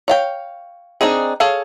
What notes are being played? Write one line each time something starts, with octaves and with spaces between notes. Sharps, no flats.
C#5 F5 G5
C4 D4 D#4 G#4
G#4 A4 C#5 F5